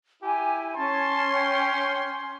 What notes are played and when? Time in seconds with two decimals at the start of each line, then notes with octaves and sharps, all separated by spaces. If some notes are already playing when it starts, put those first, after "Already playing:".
0.23 E4 G4 G#5
0.76 C#4 A5 C6
1.34 G5